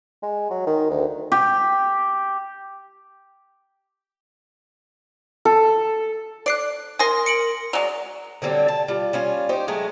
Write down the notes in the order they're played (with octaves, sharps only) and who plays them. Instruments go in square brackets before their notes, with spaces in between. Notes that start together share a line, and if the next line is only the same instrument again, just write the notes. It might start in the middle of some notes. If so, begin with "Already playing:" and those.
[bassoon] G#3
F#3
D#3
D2
[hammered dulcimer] G4
[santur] A4
[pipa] D5 [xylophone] F#6 C7 D7
[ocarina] A#4 [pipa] G#5 C6 [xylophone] D#6 A#6
[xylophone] C#7 D7 F#7
[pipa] F#3 G#3 [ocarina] D5 [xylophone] F7
[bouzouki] D3 F#3 G3 C4
A5
G3 F4
G3 C#4 F4
D#4 G4 C5
F#3 G#3 A3